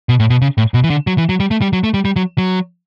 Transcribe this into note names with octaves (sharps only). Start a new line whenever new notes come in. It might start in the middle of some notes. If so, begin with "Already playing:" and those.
B2
A2
B2
C#3
A2
B2
E3
D3
F#3
E3
F#3
G3
A3
G3
F#3
A3
G3
G3
F#3
F#3